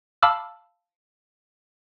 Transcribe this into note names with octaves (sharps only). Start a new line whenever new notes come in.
F5 A5 B5 D6 E6 F6